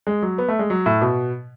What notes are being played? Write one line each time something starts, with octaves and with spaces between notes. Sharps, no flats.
G#3
F#3
B3
A3
G#3
F#3
A2
B2